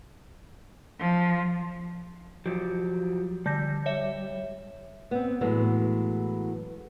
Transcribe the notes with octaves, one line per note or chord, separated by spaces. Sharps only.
F3
F3 F#3 G4
D3 G3 G6 A#6
C#5 E5
B3 C4
A2 E3 F#3 G#3 A3 B3